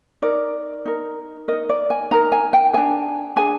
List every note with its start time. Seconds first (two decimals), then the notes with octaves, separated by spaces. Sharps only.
0.22 D#4 A#4 D5
0.86 D#4 A#4
1.48 D#4 A#4 D#5
1.69 D5
1.90 G#5
2.11 D#4 A#4 A#5
2.32 G#5
2.53 G5
2.73 D4 G#4 G#5
3.36 D4 G#4 G#5